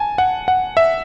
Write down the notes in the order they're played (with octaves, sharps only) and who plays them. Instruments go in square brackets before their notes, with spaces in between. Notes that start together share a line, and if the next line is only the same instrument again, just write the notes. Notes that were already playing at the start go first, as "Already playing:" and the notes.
Already playing: [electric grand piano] G#5 A5
F#5
F#5
E5